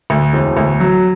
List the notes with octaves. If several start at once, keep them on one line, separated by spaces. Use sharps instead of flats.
D2
E1
D2
F#3